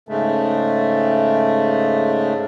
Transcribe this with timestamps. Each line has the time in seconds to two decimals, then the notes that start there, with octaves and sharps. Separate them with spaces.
0.09 G#2 C#3 G#3 A3